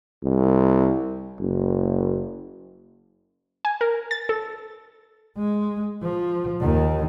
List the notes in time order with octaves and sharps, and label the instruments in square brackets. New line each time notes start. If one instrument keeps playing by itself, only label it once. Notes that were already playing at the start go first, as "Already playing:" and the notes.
[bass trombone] C2
F#1
[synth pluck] G#5
A#4
A6
A4
[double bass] G#3
F3
D#2 D#3